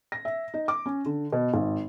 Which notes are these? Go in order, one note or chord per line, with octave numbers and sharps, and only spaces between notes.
A#6
E5
D#4
D6
C#4
D3
B2
G#1